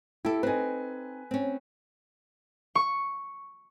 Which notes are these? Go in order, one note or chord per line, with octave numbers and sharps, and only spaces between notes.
E4 G4 A4
C4 D#4 B4 G#5
C4 C#4
C#6